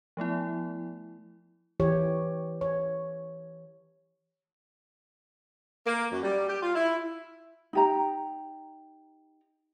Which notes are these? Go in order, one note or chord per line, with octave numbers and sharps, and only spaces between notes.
F3 A3 B3 E4
E3 G4 C#5
C#5
A#3
F#2
G3
G4
F4
E4
D#4 G4 A#5